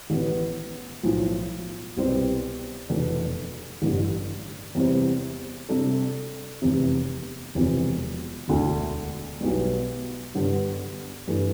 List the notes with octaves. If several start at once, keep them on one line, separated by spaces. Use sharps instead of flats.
A1 A2 E3 B3
B1 A2 F3
C2 B2 G3 C4
F1 E2 B2 A3 D4
A1 G2 D3
E2 C3 G3 C4 E4
C3 G3 D4 A4
F1 E2 C3
E1 E2 C3 F3
E1 D2 D3 A3
B1 B2 G3
G2 D3 G3 B3
G2 E3 A3 D4